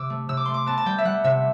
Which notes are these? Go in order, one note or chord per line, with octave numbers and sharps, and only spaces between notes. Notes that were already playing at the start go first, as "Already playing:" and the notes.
Already playing: C3 D6 E6
A3
C3 E6
D6
A3 C6
D6
B3 A5
A5
G3 G5
E5
G3 F#5
C3 E5